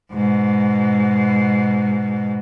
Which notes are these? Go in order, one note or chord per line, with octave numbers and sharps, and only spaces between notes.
G#2 B2